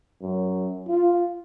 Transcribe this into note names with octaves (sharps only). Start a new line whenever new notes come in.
F#2
F4